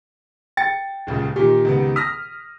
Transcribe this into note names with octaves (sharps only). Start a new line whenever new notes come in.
G5 A6 C#7
D#1 C#2 C#3
A#2 D#3 G4
C#2 D#3 B3
D#6 F6 A#6 B6